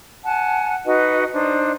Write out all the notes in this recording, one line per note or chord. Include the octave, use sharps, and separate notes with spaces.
F#5 G#5 A5
D#4 F#4 B4 D#5
D4 D#4 C5 D5